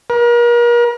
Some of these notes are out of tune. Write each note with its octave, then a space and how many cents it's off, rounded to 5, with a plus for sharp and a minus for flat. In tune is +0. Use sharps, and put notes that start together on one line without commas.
A#4 +40